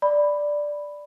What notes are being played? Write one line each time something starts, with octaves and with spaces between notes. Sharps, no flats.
D5 B5